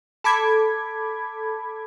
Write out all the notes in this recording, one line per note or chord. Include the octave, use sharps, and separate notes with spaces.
A4 B5 D6 G#6